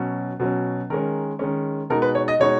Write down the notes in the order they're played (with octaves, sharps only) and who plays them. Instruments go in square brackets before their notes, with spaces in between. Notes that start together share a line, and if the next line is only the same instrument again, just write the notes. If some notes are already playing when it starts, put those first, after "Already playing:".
Already playing: [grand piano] B2 F#3 C#4
B2 F#3 C#4
D#3 G#3 C#4 A#4
D#3 G#3 C#4
B2 G#3 D#4 A#4
B4
C#5
D#5
B2 G#3 D#4 C#5